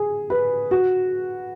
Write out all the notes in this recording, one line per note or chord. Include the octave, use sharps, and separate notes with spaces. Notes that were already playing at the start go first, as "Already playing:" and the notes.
Already playing: G#4
B4
F#4